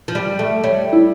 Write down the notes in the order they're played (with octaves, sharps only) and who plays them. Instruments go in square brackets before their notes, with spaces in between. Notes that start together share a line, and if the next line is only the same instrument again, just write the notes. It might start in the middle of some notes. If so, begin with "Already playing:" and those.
[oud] F3
G3
A3
[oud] G3 [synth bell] C#5
[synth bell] E4